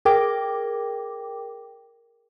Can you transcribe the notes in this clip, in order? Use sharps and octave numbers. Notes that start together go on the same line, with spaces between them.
G#4 A#4 G5 D6